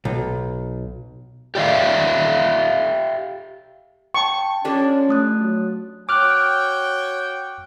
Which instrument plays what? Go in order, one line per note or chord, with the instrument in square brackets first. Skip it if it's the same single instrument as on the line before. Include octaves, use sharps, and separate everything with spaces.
[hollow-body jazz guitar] B1
[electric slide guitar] G4 D5 E5 F5
[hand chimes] G5 A5 [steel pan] C#6
[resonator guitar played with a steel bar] F3 A#3 D4 [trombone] C#4 [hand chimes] G4 A4
[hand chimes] A3 D#6 F#6
[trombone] F#3
[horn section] F#4 C#5 G5 [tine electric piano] D6 F6 F#6